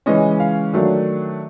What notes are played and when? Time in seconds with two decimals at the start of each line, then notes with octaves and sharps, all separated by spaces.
0.06 C#3 E3 G#3 C#4 D#5
0.40 F5
0.73 D#3 F#3 A3 D4